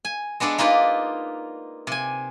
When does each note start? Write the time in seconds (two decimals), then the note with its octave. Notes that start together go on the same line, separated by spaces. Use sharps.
0.05 G#5
0.40 G#3 B3 D4 A4 D5
0.58 A#3 D#4 F4 B4 D5
1.87 C3 G#5